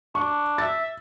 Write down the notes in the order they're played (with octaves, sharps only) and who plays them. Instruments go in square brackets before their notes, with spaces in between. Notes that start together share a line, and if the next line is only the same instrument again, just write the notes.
[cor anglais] D4 [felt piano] C#6
[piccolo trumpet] E5 [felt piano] A6